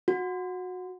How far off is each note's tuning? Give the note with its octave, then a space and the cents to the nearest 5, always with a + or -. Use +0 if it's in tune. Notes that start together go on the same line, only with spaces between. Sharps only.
F#4 -20